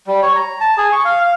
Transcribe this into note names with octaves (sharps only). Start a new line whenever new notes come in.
G3
C#5
A#5
A5
G#4
C#6
F5
F5